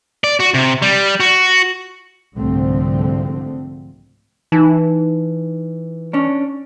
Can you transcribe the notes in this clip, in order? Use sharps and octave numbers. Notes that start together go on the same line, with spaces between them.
D5
F#4
C3
G3
F#4
C2 G#2 D3 F3 A3 C4
E3 D#4
C#4 D4